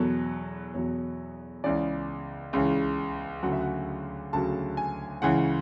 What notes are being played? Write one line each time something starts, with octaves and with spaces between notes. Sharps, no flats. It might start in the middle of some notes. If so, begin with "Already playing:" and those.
Already playing: E2 B2 F#3 A4
E2 B2 F#3 C#5
C#2 C#3 E3 D5
C#2 C#3 E3
D2 C#3 F#3 F#5
E5
F#5
D2 C#3 F#3 A5
G#5
C#2 C#3 E3 F#5